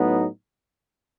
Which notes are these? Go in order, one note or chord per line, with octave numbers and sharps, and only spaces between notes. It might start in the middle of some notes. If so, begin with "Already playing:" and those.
Already playing: A2 F#3 B3 D#4